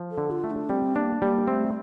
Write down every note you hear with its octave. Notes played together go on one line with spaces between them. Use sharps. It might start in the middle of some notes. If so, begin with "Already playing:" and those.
Already playing: F3
A4
D3
F4
A3
D4
G3 C4
A#3 D4
G3 A#3
A3 C4